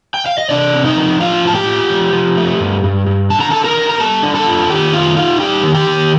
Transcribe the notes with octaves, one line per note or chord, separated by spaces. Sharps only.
G5
F5
D#5
C3 D4 D5
C4
D#4 D#5
F3
D4 F4 F5
A2 A5
G4 G5
F4
F3
F3
A3
G2
G2
G2
D3 A5
A#5
D3 A4 A5
A#4 A#5
D3
A#5
G3 A4 A5
D4
A4 A5
F4
D#3 G4 G5
A3 F4 F5
D#4 F4 F5
G3 G4 G5
D#3
G4 G5
D#3